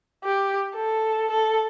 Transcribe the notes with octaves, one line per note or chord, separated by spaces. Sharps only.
G4
A4
A4